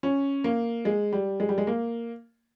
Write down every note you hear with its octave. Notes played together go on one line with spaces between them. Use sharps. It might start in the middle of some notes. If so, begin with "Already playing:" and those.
C#4
A#3
G#3
G3
G#3
G3
G#3
A#3